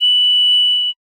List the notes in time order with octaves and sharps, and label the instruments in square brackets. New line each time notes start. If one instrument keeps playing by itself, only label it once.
[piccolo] F#7